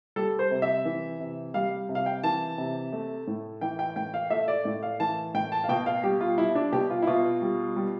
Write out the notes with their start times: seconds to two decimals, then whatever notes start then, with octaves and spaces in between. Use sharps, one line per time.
0.16 G3 A4
0.39 C5
0.51 C3
0.62 E5
0.85 E3
1.20 C3
1.54 G3 F5
1.89 C3
1.95 F5
2.06 G5
2.23 E3 A5
2.58 C3
2.92 A3
3.27 A2
3.61 E3 G5
3.79 G5
3.96 A2 G5
4.14 F5
4.30 A3 E5
4.48 D5
4.65 A2 D5
4.83 F5
5.00 E3 A5
5.34 A2 G5
5.52 A5
5.64 F5
5.69 B2 G5
5.86 F5
6.03 G3 G4
6.21 F4
6.38 G3 E4
6.55 D4
6.72 B2 G4
6.90 F4
7.02 E4
7.07 B2 F4
7.42 G3
7.76 G3